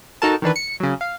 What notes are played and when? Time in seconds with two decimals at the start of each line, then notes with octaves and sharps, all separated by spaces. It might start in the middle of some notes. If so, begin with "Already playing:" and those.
0.22 D#4 F#4 A4 A#4 A5
0.42 D#3 E3 D4 B4
0.56 C#7
0.80 C#3 F#3
1.01 F5